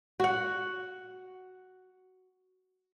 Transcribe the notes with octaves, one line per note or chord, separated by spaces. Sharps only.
F#4 F#5